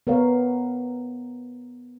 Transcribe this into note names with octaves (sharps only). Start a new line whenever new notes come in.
B3 A#4 C#5 F5